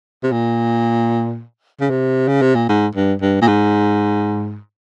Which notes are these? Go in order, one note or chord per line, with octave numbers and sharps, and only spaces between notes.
C3
A#2
C#3
C3
C#3
C3
A#2
G#2
G2
G2
A#2
G#2